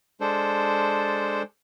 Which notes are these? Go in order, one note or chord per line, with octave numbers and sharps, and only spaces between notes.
G#3 D4 A4 C5